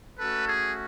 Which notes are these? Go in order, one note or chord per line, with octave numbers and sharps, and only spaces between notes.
A3 C#4 F#4 A4 B4
G#4